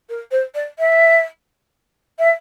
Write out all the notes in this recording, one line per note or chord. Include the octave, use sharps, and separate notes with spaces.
A#4
C5
D5
E5
E5